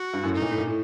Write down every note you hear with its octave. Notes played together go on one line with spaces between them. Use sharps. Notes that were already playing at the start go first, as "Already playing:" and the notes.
Already playing: F#4
G2
F#2 A2
A2 D#4
A#2
A2
A#2
A2